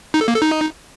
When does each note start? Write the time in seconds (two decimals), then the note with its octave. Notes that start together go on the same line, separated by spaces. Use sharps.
0.14 D#4
0.21 A4
0.28 A#3
0.35 A4
0.42 D#4